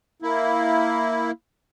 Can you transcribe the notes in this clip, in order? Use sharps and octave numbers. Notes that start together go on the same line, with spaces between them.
A#3 E4